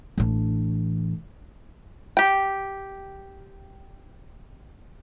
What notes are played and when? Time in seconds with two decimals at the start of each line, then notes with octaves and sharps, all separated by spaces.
0.18 A1 D4
2.17 G4 G5